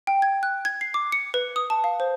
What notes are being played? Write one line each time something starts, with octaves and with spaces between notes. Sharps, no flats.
G5
G#6
F#6
G#6
C7
D6
C#7
B4
D#6
A5
F5
C5